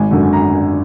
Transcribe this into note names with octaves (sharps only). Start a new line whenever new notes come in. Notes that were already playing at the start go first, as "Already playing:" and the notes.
Already playing: G#1 G#5
F#2 D3
A#5